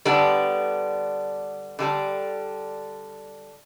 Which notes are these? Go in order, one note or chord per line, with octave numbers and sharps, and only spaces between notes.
D3 G3 B3 D4
D3 G3 D4